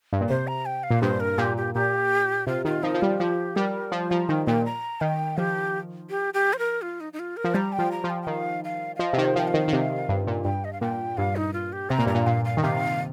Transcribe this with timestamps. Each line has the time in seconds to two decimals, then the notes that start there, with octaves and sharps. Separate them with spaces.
0.13 G2
0.21 A#2
0.30 C3 C5
0.47 A#5
0.66 G5
0.83 F5
0.90 A#2
1.02 G2 C5
1.20 A#4
1.38 A#2 G4
1.57 G4
1.74 A#2 G4
2.47 C3 F4
2.65 D#3 F4
2.83 F3 D#4
2.94 F3
3.01 G3 F4
3.20 F3 G4
3.56 G3 A#4
3.92 F3 C5
4.11 F3 A#5
4.29 D#3 G5
4.46 A#2 G5
4.65 A#5
5.01 D#3 G5
5.38 F3 G4
6.10 G4
6.34 G4
6.53 C5
6.59 A#4
6.82 F4
7.00 D#4
7.13 D#4
7.19 F4
7.37 A#4
7.44 F3
7.54 G3 A#5
7.72 G5
7.79 F3
7.92 A#5
8.04 F3
8.10 G5
8.22 G5
8.27 D#3 F5
8.64 F5
8.96 F5
8.99 F3 D#5
9.13 C3
9.18 D#3
9.25 C5
9.36 F3 G5
9.48 F5
9.54 D#3
9.68 D#3
9.73 C3
10.09 G2
10.27 A#2
10.45 G2 G5
10.64 D#5
10.73 F5
10.81 A#2 G5
11.17 G2 F5
11.36 D#4
11.54 F4
11.73 G4
11.90 C3 A#5
11.99 A#2
12.06 G2 A#5
12.15 A#2
12.27 A#2 F5
12.45 F5
12.57 D#3
12.63 C3 F5